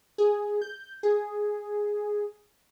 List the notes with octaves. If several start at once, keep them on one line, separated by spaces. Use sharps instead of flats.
G#4
G6
G#4